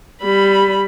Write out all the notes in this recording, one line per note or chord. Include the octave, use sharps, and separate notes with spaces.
G3 B5